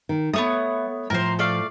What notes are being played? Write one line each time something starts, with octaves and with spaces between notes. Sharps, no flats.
D#3
A3 B3 C#5 D#6
A2 F3 A#4 C5
A3 D5 F5